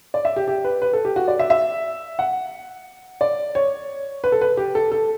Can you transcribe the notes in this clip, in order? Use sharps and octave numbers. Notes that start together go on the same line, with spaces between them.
D5
E5
G4
G4
B4
B4
A4
G4
F#4
D5
E5
E5
F#5
D5
C#5
B4
A4
B4
G4
A4
A4